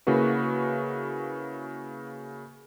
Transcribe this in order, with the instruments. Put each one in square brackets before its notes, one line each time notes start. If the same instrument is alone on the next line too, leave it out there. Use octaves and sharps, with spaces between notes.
[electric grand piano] C#3 A#3 E4 F#4 B4